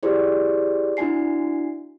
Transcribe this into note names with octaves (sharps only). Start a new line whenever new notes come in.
E4 G4 G#4 C5 D5
D4 E4 F#4 G#5 C7